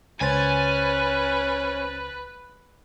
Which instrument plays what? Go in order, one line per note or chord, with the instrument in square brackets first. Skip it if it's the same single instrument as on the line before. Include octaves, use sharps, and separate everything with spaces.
[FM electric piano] C#2 C5 A6 [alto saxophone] C#4 [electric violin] B4 [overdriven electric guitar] G#5